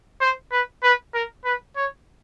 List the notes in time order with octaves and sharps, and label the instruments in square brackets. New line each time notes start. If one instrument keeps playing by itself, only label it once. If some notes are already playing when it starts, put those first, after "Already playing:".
[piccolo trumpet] C5
B4
B4
A#4
B4
C#5